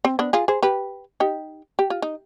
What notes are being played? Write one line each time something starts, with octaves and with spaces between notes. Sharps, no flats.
C4
B3 D4
F4 G#4
G#4 C5
G4 B4
D#4 G4
G4
F4
D#4